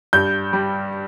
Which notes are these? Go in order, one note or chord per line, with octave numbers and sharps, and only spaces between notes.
G2 G6
G3